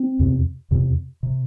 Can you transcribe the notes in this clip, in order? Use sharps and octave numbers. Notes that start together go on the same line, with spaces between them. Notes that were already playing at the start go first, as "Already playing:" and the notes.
Already playing: C4
E2 C3
E2 C3
C3